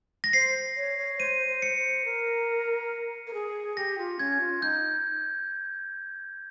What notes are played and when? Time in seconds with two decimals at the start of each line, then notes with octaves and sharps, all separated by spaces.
0.24 A#6
0.33 C5 C7
0.76 C#5
0.98 C#5
1.19 C5 D#7
1.47 C5
1.62 C#7
1.77 C5
2.05 A#4
3.27 A#4
3.34 G#4
3.77 G4 A#6
3.98 F4
4.19 C#4 G#6
4.40 F4
4.62 D#4 G6